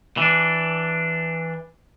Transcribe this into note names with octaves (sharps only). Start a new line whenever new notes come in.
E3 D4